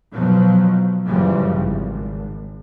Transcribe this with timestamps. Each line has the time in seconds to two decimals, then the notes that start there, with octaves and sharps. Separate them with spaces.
0.11 B2 F3 F#3
1.06 F#2 C#3 E3 F3 G3
1.55 G#1